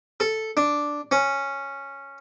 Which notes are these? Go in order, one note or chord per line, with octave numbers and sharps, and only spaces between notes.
A4
D4
C#4